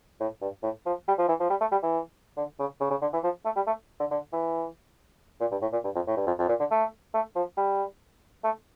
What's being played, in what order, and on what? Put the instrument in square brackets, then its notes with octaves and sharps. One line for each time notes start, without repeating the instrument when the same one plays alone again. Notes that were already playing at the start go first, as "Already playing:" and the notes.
[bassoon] A2
G2
A2
F3
G3
F3
E3
F3
G3
A3
G3
E3
D3
C#3
C#3
C#3
D3
E3
F3
A3
G3
A3
D3
D3
E3
A#2
G2
A2
A#2
G2
F2
A2
G2
F2
F2
A#2
D3
A3
A3
F3
G3
A3